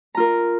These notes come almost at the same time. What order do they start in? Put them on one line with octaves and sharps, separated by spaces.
A#5 F4 A#4